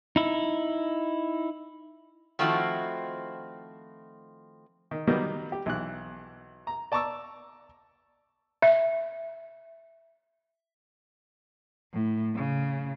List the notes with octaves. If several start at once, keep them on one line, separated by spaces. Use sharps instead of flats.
D#4 E4
D#3 F3 A3 C4 E4 F#4
D#3
D#3 F#3 G3 A#3 B3
G4
B1 E3 F#6
A#5
D5 A5 A#5 C#6 D6 E6
E5
A2
C#3